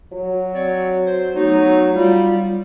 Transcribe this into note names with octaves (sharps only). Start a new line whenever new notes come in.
F#3
C4 C#5 D5
C5
F#3 A3 B3 D#4
G3 F4